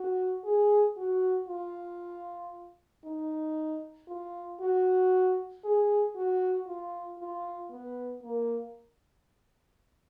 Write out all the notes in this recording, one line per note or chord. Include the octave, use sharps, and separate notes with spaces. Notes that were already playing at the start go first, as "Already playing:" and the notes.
Already playing: F#4
G#4
F#4
F4
D#4
F4
F#4
G#4
F#4
F4
F4
B3
A#3